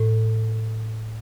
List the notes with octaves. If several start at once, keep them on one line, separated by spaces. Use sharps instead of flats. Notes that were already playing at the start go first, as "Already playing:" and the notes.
Already playing: A2